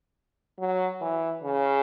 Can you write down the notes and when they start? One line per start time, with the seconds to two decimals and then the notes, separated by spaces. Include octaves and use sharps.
0.59 F#3
1.02 E3
1.43 C#3